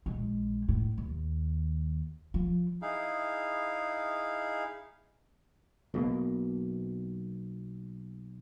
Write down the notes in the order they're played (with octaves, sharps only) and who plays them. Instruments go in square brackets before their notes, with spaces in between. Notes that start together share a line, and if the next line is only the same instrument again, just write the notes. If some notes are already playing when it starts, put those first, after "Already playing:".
[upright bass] A#1 G#3
A2
D#2
F3
[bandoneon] D#4 E4 G#4 F5
[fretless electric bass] B1 B2 A#3